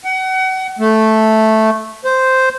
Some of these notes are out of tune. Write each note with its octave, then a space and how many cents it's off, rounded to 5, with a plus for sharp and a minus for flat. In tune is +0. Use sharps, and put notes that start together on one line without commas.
F#5 +30
A3 -5
C5 -5